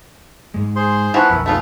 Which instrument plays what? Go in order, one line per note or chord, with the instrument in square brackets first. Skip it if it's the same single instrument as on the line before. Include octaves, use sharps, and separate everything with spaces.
[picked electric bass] G#2 G#3
[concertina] G#4 C5 C6
[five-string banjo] E3 F3 B3 [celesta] F#5 C#6 F#6
[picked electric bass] B1 F2 [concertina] A#4 B5 [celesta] E6
[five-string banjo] A3 B3 F4 [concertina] G#4